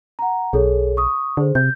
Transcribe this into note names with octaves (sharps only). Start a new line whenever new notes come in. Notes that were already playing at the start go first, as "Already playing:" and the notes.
F#5 A#5
B1 G#4 A4 C#5
C#6 D#6
D3 G#4 C5
C3 G6